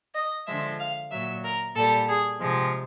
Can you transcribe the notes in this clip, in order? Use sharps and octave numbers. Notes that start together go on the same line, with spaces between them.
D#5
D3 F3 G#3 E5
F5
A#2 F#3 E5
A#4
A#2 G3 A4
G#4
C3 F3 G#3